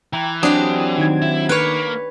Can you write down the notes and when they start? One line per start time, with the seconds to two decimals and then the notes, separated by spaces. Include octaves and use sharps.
0.13 E3 G5 A#5
0.43 F#3 C4 D4 G4 D#6
0.98 D#3 D#4 G#6
1.22 E4
1.49 A#3 B4 C#5